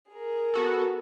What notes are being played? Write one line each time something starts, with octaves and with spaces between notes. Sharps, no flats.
G#4 A#4
B3 F#4 A4